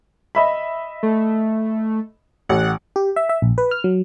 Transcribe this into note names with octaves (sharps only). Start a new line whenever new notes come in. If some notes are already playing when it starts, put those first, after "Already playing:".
D#5 E5 B5
A3
A1 F#5
G4
E5
E5
A#1
B4
F6
F#3